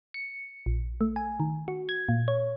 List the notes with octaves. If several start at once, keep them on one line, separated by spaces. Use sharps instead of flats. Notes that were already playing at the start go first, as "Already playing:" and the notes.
C#7
A#1
A3
G#5
D#3
F#4
G#6
A#2
C#5